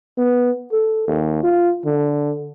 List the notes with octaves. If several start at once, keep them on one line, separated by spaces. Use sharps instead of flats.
B3
A4
D#2
F4
D3